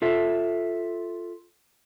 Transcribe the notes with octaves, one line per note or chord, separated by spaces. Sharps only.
F4 A4 E5